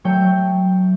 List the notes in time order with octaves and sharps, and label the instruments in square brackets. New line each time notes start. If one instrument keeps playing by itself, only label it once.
[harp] F#3 A3 C#5 G5 E6 G6